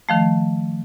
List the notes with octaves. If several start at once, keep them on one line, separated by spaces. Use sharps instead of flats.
D#3 F3 A3